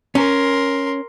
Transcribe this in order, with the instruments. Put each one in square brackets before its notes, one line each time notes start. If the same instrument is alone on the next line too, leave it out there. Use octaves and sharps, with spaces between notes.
[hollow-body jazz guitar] C#4 [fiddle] A#4 C6